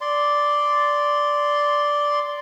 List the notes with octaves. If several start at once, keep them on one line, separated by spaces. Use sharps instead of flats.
D5 C6